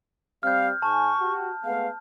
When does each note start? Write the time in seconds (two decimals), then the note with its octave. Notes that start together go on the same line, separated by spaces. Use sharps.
0.43 G3 C4 F5 F6 G6
0.82 G#2 G#5 A5 C#6
1.19 F#4 G4
1.64 G#3 A3 B3 F5